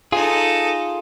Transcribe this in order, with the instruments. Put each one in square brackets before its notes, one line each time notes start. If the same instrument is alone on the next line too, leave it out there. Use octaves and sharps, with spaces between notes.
[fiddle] D#4 A4 [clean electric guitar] F4 G#4